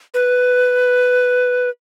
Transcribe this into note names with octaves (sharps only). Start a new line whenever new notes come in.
B4